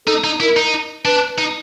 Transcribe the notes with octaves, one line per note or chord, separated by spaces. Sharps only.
D#4 A4
D#4
E4 A#4
D#4
D4 B4
D#4